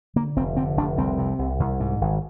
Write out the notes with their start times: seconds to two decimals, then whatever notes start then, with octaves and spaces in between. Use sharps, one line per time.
0.16 D3 A#3
0.37 F1 C4
0.56 D3 C4
0.77 F1 D4
0.98 C2 C4
1.19 C3
1.39 C2
1.60 C2
1.80 G#2
2.01 G#1